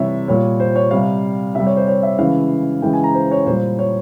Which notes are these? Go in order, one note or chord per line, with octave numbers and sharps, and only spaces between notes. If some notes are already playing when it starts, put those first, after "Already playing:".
Already playing: C3 E3 G3 C#5 E5
A#2 G3 C#5
C5
C#5
C3 G3 F5
C3 G3 E5
C#5
C5
C#5
E5
C#3 E3 G#3 F5
C#3 E3 G#3 G5
G#5
A#5
C5
C#5
A#2 G3 C5
C#5